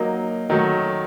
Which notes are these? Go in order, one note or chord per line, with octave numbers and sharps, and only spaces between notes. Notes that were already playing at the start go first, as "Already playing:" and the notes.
Already playing: F#3 A#3 D#4
D#3 F#3 A3